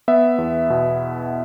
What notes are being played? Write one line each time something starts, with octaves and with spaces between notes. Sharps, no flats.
B3 E5
E2
B2